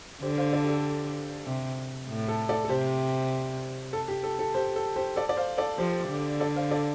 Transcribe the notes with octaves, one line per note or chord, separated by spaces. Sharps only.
D3 G4 C5
C5 F5
A4 D5
G4
A4
C3
A2
A4
A4 D5
A4
C3 G4 C5
A4
G4
A4
A4
G4 C5
A4
G4 C5
A4 D5
D5
C5 F5
A4 D5
F3 G4 C5
D3
A4 D5
C5 F5
A4 D5